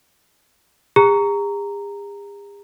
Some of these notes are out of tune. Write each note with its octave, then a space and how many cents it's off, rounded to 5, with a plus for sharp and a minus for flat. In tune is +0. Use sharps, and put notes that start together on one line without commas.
G#4 -45 A#5 -5